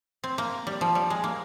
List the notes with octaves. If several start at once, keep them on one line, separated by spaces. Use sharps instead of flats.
C4
A#3
G3
F3
G3
G#3
A#3